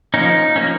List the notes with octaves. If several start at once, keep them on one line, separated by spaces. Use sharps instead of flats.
F3 A#3 C#4 D#4
F3 A#3 C#4